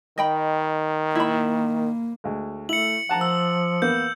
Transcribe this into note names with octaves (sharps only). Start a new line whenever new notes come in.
D#3 D#5 G5 B5
A#3 E4 B5
D2 G#3
A3 E4 C#7 F#7
F3 F#5 A5 A#5
E6
E2 A#3 B3 G6